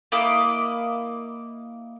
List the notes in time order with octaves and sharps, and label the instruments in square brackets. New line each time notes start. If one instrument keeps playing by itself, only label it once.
[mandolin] A#3 E4 D#5 D6